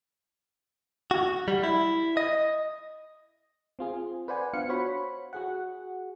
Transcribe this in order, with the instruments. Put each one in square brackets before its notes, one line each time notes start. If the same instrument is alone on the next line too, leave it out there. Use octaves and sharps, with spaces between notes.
[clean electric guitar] F#4
G3
E4
D#5
[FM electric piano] C4 F4 G#4
B4 C5 D5 F#5 G#5
B3 D4 F4 F5 F#5 C#7
F#4 C5 C#5 B5
F#4 G#4 F#5